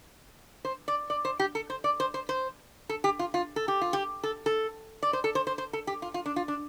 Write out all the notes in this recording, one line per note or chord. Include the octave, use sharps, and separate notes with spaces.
C5
D5
D5
C5
G4
A4
C5
D5
C5
C5
C5
A4
G4
F4
F4
A4
G4
F4
G4
A4
A4
D5
C5
A4
C5
C5
C5
A4
G4
F4
F4
D4
F4
D4